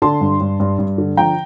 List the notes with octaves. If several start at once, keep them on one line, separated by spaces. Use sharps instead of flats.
D3 A5 C6
G2
G2
G2
G2
D3
F3 G5 A#5